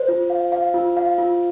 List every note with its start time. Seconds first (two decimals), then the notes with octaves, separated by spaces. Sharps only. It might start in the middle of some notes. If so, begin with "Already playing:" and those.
Already playing: C5
0.08 F4
0.30 F5
0.52 F5
0.74 F4
0.97 F5
1.18 F4